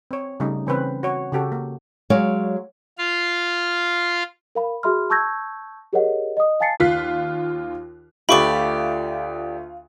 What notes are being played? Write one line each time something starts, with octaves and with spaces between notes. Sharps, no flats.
C4 C#5
C#3 G3 A3 C#4 D#4
C#3 E3 C4 C#4 B4 C5
F#4 C#5
C#3 F#4 G4 A4
A#3
F#3 G#3 C#5 D5 F5
F4 F5
A#4 F5 B5
F#4 G#4 E5 B5 C6 F6
A5 C#6 E6 G6 G#6 A#6
G4 G#4 A#4 C#5 D#5 F#5
D#5 D#6
F5 G#5 A5 A6 C7 C#7
D#2 F4 F#6 B6 C7
D2 A3 F4 G4 D5 E5 B5 C#6